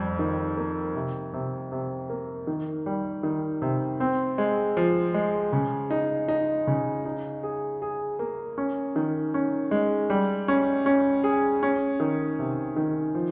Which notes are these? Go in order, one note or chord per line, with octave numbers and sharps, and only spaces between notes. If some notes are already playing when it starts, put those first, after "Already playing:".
Already playing: F2 G3
D#3
A#3
C3
C3
C3
A#3
D#3
G3
D#3
C3
C4
G#3
F3
G#3
C#3
D#4
D#4
C#3
D#4
G#4
G#4
A#3
C#4
D#3
C#4
G#3
G3
C#4
C#4
G#4
C#4
D#3
C3
D#3
F3